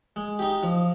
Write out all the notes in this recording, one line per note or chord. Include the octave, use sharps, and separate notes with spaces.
G#3
D#4 G4
F3